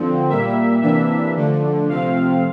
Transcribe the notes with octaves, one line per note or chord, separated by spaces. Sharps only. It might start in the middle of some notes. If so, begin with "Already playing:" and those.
Already playing: D3 F3 C4
A#2 G3 A#3 E5
C3 E3 A#3 D4 E5
D3 F3 A3 D4
C3 F3 A3 C4 F5